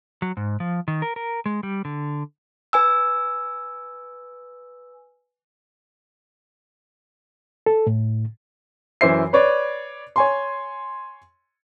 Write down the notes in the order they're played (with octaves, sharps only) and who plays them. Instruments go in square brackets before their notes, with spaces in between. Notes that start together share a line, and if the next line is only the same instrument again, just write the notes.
[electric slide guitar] F#3
G#2
F3
D#3
A#4
A#4
G#3
G3
D3
[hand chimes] B4 G#5 E6
[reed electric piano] A4
A2
[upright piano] F#2 E3 E4 C5 E5 C7
B4 C#5 D5
C#5 G#5 C6